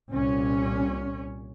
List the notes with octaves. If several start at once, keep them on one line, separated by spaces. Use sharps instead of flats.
C2 A#2 C#4